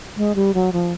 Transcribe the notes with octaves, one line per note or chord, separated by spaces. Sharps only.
G#3
G3
F#3
F3